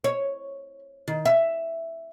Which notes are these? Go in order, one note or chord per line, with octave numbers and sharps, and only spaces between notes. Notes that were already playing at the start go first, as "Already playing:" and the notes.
C#5
D#3
E5